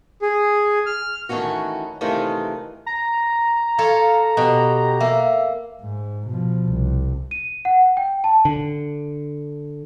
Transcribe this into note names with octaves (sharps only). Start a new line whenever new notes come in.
G#4
F6
D#3 E3 A3 C#4 F#4
C3 D#3 E3 G#3 A3 F4
A#5
F4 A4 C#5 F5
B2 G4
A#3 E5
G#2
B2 F3
C2
D#7
F#5
G5
A5
D3